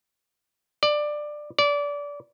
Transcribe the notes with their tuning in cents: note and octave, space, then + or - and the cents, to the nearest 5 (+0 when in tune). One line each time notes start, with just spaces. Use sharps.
D5 +15
D5 -25